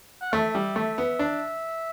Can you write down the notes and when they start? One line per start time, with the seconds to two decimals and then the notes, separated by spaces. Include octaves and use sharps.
0.21 F#5
0.32 A3 E5
0.55 G3
0.76 A3
0.98 B3
1.19 D4